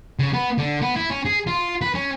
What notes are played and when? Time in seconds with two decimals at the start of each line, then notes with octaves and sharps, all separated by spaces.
0.19 C#3
0.34 B3
0.58 D3
0.82 B3
0.96 E4
1.10 C#4
1.25 G#4
1.47 F4
1.81 B4
1.95 C#4